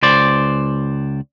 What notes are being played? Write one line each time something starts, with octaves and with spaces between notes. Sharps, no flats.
C#2 C5 D5